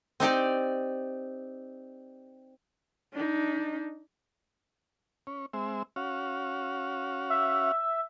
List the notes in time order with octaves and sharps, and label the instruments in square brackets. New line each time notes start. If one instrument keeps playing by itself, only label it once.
[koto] C4 D#4 G4 D5
[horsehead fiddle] D4 D#4
[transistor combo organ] C#4
G#3 C4 E5
C#4 F#4 F5
[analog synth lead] E5